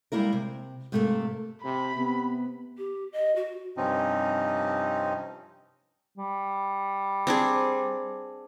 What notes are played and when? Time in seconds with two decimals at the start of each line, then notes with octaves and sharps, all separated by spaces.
0.12 G3 G#3 A#3 E4 A#4
0.33 C3
0.92 G#2 C3 A3 A#3 A4
1.64 C3 B5
1.96 C3 B3
2.78 G4
3.13 D#5
3.36 F#4
3.77 G2 C3 F3 C4 C#4 D#4
6.18 G3
7.27 C4 D4 G#4